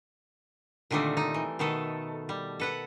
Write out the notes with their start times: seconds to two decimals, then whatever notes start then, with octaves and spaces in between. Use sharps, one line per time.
0.91 A#2 D3 D#3 G3 A3 C4
1.17 D#4
1.34 E3
1.59 B2 D#3 A3 A4
2.29 G3
2.60 A4 B4 F#5